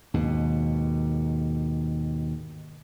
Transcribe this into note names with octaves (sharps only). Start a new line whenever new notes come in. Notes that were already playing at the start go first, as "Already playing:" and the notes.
D#2 G#2 B2